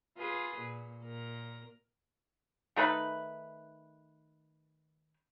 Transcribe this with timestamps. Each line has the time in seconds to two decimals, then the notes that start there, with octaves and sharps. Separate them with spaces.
0.17 F4 G#4 B4
0.57 A#2
1.02 A#2 A#4
2.76 D#3 A3 D#4 B4